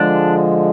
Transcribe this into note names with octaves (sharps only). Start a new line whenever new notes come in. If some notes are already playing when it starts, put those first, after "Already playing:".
Already playing: D3 F3 G#3 D4